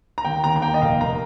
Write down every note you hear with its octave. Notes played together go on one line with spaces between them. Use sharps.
A#5
D#2 G5
D#2 A#5
A#5
A#3 G5
D#5
F1 F5
A#3 A#5